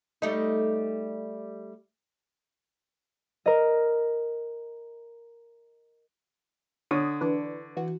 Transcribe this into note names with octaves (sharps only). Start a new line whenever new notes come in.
G3 A3 D#4
A#4 D#5
D3 C#5 D#6
E3 D4 B4
E3 F#4